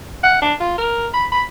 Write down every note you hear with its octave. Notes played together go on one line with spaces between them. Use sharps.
F#5
D4
F4
A#4
B5
B5